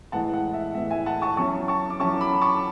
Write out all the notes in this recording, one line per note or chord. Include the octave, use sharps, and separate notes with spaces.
A2 E3 G#3 F#5 A5
F#5
E5
A2 E3 G#3 E5
E5 G#5
F#5 A5
A5 C#6
F#3 C#4 E4 A5 C#6
A5 C#6
D6
F#3 C#4 E4 A5 C#6
B5 D6
A5 C#6